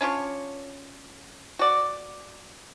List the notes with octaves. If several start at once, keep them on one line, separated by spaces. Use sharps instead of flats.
C#4 D4 F4 C#5
F#4 D5